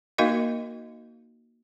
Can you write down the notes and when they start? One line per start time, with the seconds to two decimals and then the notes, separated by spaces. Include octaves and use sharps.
0.18 A#3 D#4 F#4 A#4 D#5 F5